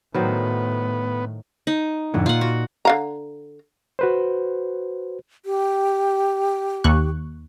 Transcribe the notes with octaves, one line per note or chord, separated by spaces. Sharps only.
A2 D#3 F#3 B3 C5
D#4
F2 A2 D3
A#2 F4 F#5
F#4
D3 F5 A#5
F#4 B4 C5
G4
D#2 C#6 F#6